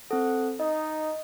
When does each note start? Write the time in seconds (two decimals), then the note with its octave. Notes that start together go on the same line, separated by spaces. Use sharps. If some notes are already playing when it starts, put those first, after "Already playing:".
0.11 C4 A4 F#5
0.60 D#4 D#5